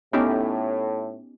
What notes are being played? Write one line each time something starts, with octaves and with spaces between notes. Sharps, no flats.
A2 B3 C#4 D#4 G4